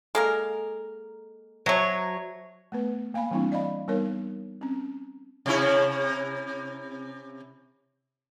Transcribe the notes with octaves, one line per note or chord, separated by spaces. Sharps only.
G#3 A#3 A4 A#4 A#5
F#3 C5 C#5 E5 A5
A3 B3 B4
A#3 F5 G#5 B5
E3 G3 A#3 C4 D4 E4
D5 D#5 F5 B5
G3 B3 D#4 A#4 C#5
C4 C#4
C3 C#4 E4